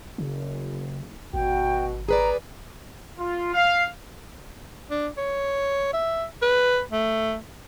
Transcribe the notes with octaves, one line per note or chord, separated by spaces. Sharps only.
F#1 C#3
G#1 B2 F#4 G5
G#4 B4 D5 A#5
F4
F5
D4
C#5
E5
B4
A3